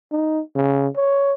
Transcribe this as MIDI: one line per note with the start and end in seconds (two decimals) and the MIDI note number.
0.12 0.41 63
0.56 0.88 49
0.96 1.33 73